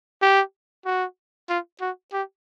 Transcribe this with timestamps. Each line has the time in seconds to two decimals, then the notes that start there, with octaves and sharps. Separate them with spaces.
0.22 G4
0.85 F#4
1.49 F4
1.81 F#4
2.13 G4